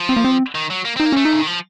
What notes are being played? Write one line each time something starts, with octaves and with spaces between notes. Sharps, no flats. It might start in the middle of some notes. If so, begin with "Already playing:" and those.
Already playing: F3
C4
A#3
C4
D#3
F#3
A#3
C4 D#4
A#3
A3 C#4
D#4
C#3
D#3
F3